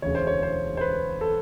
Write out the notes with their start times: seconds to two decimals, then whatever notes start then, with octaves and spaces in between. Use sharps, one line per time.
0.02 E1 D2 C#3 E3 C#5
0.15 C5
0.27 C#5
0.43 C5
0.77 C5
0.81 B4
1.21 A4